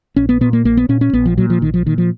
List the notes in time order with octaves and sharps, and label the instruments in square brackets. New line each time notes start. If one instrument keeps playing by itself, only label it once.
[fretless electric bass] A#1 C#4
B3
A#2 B3
A#3
A#1 A#3
B3
A#2 C#4
C#4
A#1 B3
F3
A#2 F#3
F3
A#1 D#3
F3
A#2 D#3
F3